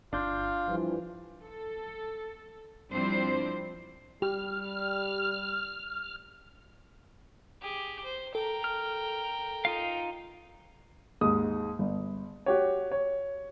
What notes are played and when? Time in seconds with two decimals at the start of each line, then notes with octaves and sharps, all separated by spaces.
0.13 G1 D4 F4 F5 G6
0.68 G2 E3 F3
1.42 A4
2.91 F3 G3 C4 D4 E4 C5
4.22 G3 G4 F6
7.62 G4 G#4
8.04 C5
8.35 A4 A#4 G5
8.64 F6
9.65 D#4 F4 F5
11.21 D#2 G#2 D#6
11.79 G1
12.46 F#4 G4 C#5
12.91 C#5